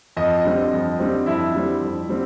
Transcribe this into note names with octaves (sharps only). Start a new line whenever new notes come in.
F2 D#5
D3 G3 C4
F2
D3 G3 C4
F2 E4 E5
D3 G3 C4
F2
D3 G3 C4